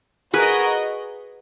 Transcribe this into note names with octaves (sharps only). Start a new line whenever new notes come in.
F#4 G#4 A#4 B4 D#5